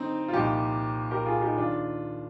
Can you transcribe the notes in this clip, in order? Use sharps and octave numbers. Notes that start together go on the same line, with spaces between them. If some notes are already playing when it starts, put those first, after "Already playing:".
Already playing: D3 C4 D#4
F4
C2 A#2 F3 D#4 G4
G4 A#4
F4 G#4
D#4 G4
D#2 D#3 D4 F4